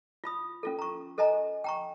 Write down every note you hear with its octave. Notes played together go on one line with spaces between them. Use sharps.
F4 B5 D#6
C#4 F4 A4
A#5 C#6
A4 C5 D#5 G#5 A#5
G5 A#5 C#6